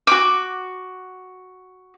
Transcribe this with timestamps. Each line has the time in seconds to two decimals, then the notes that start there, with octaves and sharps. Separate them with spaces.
0.07 F#4 D6